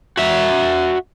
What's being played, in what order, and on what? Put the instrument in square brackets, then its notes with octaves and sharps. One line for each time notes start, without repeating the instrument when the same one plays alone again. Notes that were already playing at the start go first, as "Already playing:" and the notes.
[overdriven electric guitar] F#4 E5